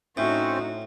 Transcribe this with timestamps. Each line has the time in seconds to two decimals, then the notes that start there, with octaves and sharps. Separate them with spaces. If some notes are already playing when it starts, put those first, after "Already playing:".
0.17 A2 C4 C#4 D#4 F#4 C5